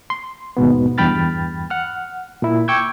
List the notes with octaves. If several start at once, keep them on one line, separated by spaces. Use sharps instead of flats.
C6
D#2 G#2 B2 B3
E2 G2 G5 B5 F6 A6
F#5 F6
A#2 E4
G5 C#6 D6 E6 G6 G#6